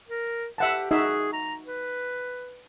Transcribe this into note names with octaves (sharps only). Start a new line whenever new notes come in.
A#4
G4 E5 F#5 A5
D#4 F#4 G#4 E5
A#5
B4